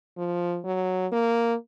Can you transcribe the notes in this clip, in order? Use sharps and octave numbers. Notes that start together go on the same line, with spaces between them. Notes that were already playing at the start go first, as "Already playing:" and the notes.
F3
F#3
A#3